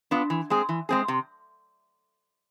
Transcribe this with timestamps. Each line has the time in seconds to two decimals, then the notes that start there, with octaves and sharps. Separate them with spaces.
0.11 B3 D4 F4
0.30 E3
0.50 G#3 C4 G#4
0.69 E3
0.89 G#3 C4 G#4
1.08 C3